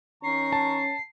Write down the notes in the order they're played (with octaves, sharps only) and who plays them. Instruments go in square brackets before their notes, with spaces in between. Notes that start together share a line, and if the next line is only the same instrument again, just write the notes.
[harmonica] D#3 A#5 C#6 [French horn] C#4 [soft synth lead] C7
[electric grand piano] A5